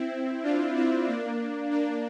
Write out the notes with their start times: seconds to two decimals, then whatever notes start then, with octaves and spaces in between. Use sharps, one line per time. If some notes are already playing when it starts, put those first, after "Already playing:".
Already playing: C4 E4
0.43 D4 F4
0.75 C4 E4
1.08 A#3 D4
1.71 A#3 D4